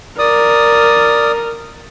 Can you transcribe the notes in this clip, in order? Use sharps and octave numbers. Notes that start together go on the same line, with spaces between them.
A#4 D5 D#6